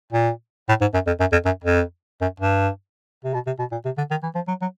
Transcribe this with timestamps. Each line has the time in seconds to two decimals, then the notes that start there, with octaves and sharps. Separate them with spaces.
0.12 A#2
0.69 A2
0.81 G#2
0.94 F#2
1.07 F2
1.20 F#2
1.32 F2
1.45 F#2
1.64 F2
2.21 F#2
2.40 G2
3.24 C3
3.34 B2
3.47 C3
3.59 B2
3.72 A#2
3.85 C3
3.98 D3
4.11 D#3
4.23 E3
4.35 F3
4.48 F#3
4.61 F#3